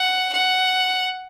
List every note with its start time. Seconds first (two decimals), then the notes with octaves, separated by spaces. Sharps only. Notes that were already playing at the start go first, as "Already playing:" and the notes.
Already playing: F#5
0.33 F#5